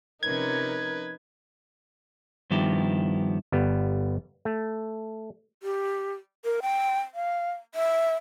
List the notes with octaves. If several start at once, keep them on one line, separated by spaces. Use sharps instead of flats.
C3 F3 C#4 D#4 A#4 B4 G#6
G2 D#3 F3 B3 E4 G4
G1 G3 B3
A3
G4
A#4
G5
F5
E5